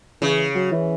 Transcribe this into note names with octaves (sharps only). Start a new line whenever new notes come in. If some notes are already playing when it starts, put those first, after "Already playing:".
C#3 E3
F#3
E3